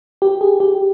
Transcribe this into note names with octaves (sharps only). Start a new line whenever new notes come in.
G4
G#4
G4